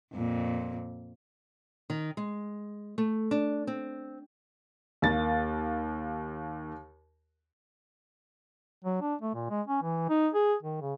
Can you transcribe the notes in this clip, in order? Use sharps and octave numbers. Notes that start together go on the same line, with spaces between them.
F2 A#2
D#3
G#3
A3
D4
C4
D#2 A#3 A6
F#3
D4
A3
A#2
G#3
C#4
E3
D#4
G#4
D#3
C#3